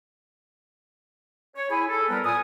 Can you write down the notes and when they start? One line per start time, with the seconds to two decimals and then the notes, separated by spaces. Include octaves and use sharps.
1.56 C#5
1.70 E4 G#4 G#5 B5
1.88 A4
2.09 G3 B3 A#4 B4
2.24 A#2 G#5 D#6